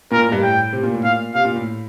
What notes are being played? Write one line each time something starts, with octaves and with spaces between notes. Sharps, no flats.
A#2 A#4
A2
G2
A2 G5
C3
A#2
A2
A#2 F5
C3 F5
A#2
A2